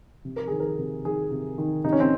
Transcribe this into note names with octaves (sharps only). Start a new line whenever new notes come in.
C3
A#4
D#3 G#4
A#4
C3
D#3 G#4
C3
D#3
C3 D#4
C#4
C4